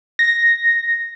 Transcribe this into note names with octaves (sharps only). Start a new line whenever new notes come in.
A#6